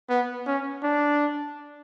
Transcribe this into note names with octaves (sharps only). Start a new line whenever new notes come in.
B3
C#4
D4